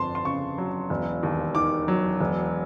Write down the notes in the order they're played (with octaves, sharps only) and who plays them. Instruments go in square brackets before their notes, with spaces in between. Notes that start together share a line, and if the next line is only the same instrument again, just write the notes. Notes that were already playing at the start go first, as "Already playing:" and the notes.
Already playing: [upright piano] G1 F2 A5 C6
C6
C#3 C#6
F#3
E1
D#2
D#3 D6
F#3
E1